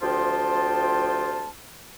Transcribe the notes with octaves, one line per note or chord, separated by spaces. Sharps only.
D2 C3 F3 F4 G5 A5